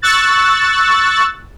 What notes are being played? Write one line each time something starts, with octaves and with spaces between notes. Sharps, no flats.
C#6 E6 F#6 A6